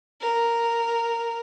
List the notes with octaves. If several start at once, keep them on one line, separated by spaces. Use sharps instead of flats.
A#4